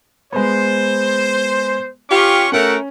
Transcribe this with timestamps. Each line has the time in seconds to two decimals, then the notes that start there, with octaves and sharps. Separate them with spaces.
0.32 G#3 B3 C5
2.10 C#4 F4 G4 C#6
2.52 A3 C#4 F#4 A#4 E5 F#5